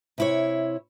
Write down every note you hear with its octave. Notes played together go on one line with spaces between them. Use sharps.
C3 E4 C#5